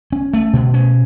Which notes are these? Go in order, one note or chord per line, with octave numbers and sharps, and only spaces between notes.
C#4
A3
B2
C#4